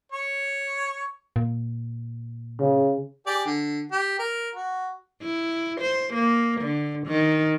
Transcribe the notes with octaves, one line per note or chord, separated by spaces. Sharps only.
C#5
A#2
C#3
G4 G#4 D5
D3
G4
A#4
F#4
E4
C5
A#3
D3
D#3